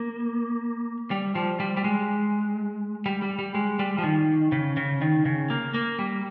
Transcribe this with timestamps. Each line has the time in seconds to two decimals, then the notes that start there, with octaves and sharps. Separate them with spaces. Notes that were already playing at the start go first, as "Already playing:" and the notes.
Already playing: A#3
1.11 G3
1.35 F3
1.60 G3
1.77 G3
1.84 G#3
3.06 G3
3.22 G3
3.39 G3
3.55 G#3
3.79 G3
3.98 F3
4.04 D#3
4.52 C#3
4.77 C#3
5.02 D#3
5.25 C#3
5.50 A#3
5.74 A#3
5.99 G3